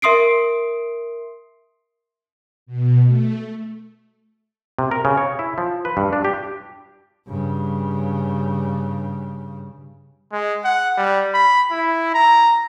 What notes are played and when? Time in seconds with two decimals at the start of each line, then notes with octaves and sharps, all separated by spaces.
0.02 A#4 E5 C6 D#6 C7 D7
2.66 B2
3.05 A3
4.79 C3
4.91 A#4
5.05 C#3
5.17 C#5
5.39 E4
5.58 F3
5.85 B4
5.97 G2
6.13 D4
6.24 G4
7.28 G2 C#3
10.32 G#3
10.64 F#5
10.97 G3
11.34 B5
11.71 E4
12.14 A#5